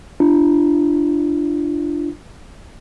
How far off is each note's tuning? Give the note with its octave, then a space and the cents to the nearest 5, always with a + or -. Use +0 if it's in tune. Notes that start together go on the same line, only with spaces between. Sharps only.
D4 +5 F4 -40